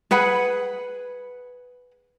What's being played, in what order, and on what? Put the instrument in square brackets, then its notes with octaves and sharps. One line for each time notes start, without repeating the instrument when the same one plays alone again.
[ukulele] G#4 B4 F#5 B5